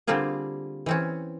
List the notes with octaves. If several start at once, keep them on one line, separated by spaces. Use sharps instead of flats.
D3 G3 A#3 C4 F4 G#4
E3 C4 C#4